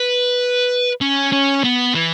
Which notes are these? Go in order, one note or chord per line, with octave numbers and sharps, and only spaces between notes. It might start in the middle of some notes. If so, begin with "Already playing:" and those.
Already playing: B4
C#4
C#4
B3
E3